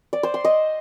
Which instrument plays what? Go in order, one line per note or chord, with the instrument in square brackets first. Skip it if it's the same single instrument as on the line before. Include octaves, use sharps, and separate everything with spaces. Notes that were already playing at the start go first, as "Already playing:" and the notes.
[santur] D5
C5
C6
D#5